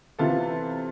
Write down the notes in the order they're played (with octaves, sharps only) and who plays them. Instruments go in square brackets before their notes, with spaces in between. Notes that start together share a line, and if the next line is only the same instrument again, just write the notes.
[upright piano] C3 E3 B3 F4 A4